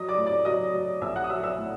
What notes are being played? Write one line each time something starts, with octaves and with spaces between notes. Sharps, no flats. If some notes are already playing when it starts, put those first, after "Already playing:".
Already playing: F#3 D#5 D#6
D5 D6
A2
D5 D6
F#3 D#5 D#6
F#3
A#1 E5 E6
F#5 F#6
D#6
F#3 E5 E6
E5 E6
A2